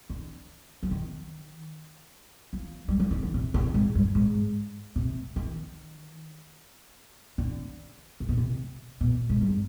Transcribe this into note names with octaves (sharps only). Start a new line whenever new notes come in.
D3
F3
D#3
F3
G3
F3
D#3
D3
C3
C3
G#2
G2
G#2
C3
D#3
D3
C3
B2
C3
B2
G#2
G2